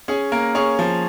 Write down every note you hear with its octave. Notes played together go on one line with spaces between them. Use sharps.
C#4 G#4
A#3 A#4
C#4 G#4 C#5
F3